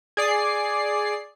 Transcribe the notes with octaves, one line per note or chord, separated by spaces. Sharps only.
G#4 D5 C7